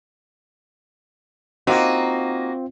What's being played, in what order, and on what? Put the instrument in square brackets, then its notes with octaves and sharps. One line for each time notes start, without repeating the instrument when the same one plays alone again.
[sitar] A#3 F#4 [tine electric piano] C4 F4 [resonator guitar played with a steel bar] D#4